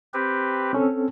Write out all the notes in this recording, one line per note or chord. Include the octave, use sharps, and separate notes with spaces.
C4 G4 B4
C4 C#4 A4